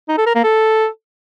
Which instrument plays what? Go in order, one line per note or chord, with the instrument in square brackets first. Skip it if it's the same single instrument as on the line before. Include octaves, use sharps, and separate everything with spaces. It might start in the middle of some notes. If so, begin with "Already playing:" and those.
[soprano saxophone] D#4
A4
A#4
A#3
A4